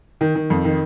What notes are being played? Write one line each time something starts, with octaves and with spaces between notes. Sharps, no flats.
D#3
D#3
F2
D#3